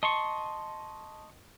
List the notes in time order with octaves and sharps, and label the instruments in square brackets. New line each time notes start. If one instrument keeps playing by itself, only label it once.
[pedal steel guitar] D#5 C6 C#6 [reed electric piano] A5